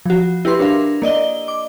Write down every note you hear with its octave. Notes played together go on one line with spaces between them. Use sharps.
F3 F#4
E4 G4 B4 C6
D4 A#4 F5
A#3 D5 D#5 G7
D6